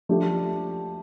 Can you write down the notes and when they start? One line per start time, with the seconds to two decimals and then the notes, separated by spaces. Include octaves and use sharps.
0.09 F3 A3 D4 G4